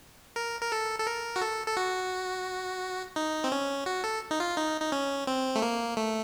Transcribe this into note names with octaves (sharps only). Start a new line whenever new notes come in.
A#4
A#4
A4
A4
A#4
F#4
A4
A4
F#4
D#4
C4
C#4
F#4
A4
D#4
F4
D#4
D#4
C#4
C4
A3
A#3
A3